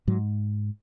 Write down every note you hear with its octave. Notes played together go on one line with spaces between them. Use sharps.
G#2 F#3